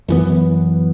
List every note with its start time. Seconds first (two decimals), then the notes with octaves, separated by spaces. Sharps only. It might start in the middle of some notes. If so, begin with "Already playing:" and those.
0.08 F#2 E3 B3